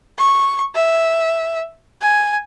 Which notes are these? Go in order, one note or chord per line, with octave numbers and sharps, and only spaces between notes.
C#6
E5
G#5